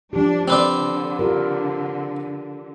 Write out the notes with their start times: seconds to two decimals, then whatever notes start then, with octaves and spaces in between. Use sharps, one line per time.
0.13 F3 D4 G4
0.48 D3 C4 B4 D5
1.19 F4 G4 A#4